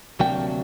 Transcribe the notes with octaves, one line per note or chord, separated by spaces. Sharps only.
D2 C3 F#3 A#3 D4 G5